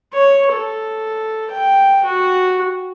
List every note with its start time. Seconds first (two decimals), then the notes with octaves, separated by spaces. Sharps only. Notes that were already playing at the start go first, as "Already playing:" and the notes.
0.13 C#5
0.53 A4
1.52 G5
2.05 F#4